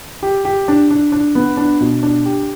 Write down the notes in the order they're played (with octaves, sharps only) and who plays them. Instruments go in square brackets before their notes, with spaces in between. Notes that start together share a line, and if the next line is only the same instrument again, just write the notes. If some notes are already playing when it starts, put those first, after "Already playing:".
[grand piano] G4
G4
D4
D4
D4
B3
D4
B2
D4
G4